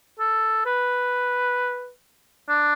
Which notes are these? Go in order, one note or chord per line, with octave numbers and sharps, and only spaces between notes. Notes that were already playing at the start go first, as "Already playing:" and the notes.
A4
B4
D4